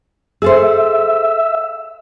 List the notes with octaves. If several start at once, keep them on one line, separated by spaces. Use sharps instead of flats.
G#4 A4 C5 E5